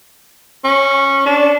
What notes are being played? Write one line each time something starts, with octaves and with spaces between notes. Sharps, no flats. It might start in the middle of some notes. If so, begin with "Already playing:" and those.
C#4
D4